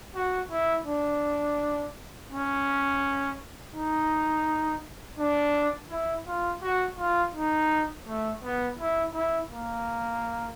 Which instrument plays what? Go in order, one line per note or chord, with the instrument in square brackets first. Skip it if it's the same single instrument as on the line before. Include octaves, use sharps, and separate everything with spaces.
[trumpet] F#4
E4
D4
C#4
D#4
D4
E4
F4
F#4
F4
D#4
A3
B3
E4
E4
A#3